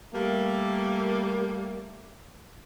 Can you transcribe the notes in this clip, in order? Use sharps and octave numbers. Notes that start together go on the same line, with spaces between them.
G3 A3 A#3